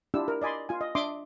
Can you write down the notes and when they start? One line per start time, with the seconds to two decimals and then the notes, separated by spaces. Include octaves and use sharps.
0.14 D4 E4 F4 G4 E6
0.28 A#4
0.42 D5 D#5 G#5 B5 C6
0.69 F4 G#5
0.81 D#5
0.95 D4 E5 C6 D6 D#6